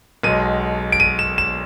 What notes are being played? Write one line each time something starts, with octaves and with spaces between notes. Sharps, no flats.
B1 B2 G#3 D#7
D7
D#7
E7
E7